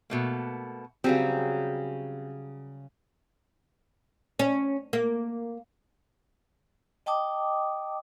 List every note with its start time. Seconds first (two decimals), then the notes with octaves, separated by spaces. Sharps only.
0.10 B2 A3 A#3
1.04 C#3 F#3 G3 C4 G#4
4.39 C#4
4.93 A#3
7.06 D#5 G5 A5 D6 D#6